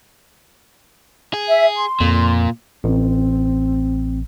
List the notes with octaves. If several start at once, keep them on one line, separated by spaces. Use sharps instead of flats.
G#4
E5
C6
F2 A#2
A1 C4